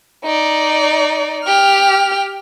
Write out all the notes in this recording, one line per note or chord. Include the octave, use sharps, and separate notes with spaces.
D#4 D5
G4 F6